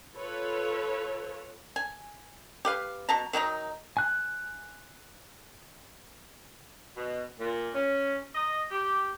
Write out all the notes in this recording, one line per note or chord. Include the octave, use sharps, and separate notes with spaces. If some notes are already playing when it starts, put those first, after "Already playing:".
F4 A4 B4 C#5
G#5
G4 B4 F5
B2 A5 A#5
D#3 F#3 D#4 A#5
G#5 F#6
B2
A#2
C#4
D#5
G4